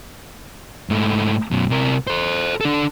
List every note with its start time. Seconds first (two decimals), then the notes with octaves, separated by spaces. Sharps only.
0.90 G#2 A3
1.51 F#2 B2
1.70 C3 A#4
2.07 A4 C5
2.61 D4 A4